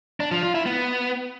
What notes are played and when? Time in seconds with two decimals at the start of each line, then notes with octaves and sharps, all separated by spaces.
0.20 D4
0.32 F3
0.43 F4
0.54 E4
0.66 B3